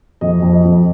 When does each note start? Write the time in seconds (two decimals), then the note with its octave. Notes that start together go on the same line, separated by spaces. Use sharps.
0.21 F2 D#5
0.42 F2
0.53 D#5
0.65 F2